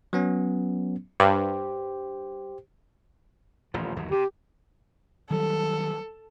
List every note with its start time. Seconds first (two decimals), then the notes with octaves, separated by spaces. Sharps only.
0.13 F#3 B3 C#4
1.20 G2 G4 C5
3.74 D#1 A1 F3
3.96 G1 D#2 F#3
4.11 C3 G4
5.31 D#3 F#3 G3 A4